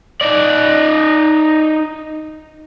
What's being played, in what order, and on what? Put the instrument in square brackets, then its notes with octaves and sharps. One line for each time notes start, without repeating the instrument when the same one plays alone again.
[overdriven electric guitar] D#4 D5